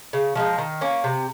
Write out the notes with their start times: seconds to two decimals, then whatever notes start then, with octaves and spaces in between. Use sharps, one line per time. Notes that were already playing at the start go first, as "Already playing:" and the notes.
0.13 C#3
0.35 F3 G#3 D#4
0.58 D#3
0.81 A#3 C#4
1.04 C3